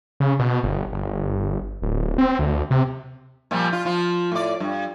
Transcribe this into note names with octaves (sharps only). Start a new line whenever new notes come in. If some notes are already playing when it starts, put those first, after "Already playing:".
C#3
B2
G1
G1
D1
C4
D2
C3
A#2 F3 G3
F4
F3 F4
A2 D5
G2